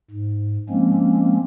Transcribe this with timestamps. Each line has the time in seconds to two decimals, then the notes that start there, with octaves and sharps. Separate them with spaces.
0.10 G#2
0.70 F3 G#3 A#3 C4 C#4